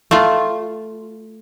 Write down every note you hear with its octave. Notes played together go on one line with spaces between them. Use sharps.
A3 F4